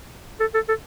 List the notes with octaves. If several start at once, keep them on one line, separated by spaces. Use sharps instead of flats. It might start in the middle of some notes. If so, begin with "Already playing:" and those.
A4
A4
A4